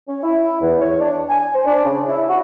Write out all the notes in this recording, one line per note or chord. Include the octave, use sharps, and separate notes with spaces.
C#4
E4
E2
C#5
D4
G#5
C5
D4
C#3
E4
F#4